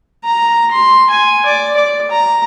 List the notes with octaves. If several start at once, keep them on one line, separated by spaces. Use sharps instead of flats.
A#5
C6
G#5
D5
D5
A#5